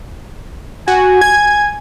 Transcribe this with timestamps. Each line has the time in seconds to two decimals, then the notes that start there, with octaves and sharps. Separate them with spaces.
0.88 F#4 G#5
1.21 G#6